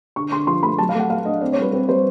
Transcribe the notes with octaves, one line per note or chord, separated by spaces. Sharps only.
D3 C#6
D3 C6
F3 C6
A3 B5
F#3 A5
F5
A3 F#5
A3 F5
D4 D#5
C4 D5
C#5
G3 B4
C4 B4
G3 C5